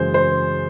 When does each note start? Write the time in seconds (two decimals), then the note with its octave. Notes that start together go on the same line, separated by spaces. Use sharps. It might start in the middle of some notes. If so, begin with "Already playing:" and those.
Already playing: F#2 C#3 E3 G#3 C5
0.14 C5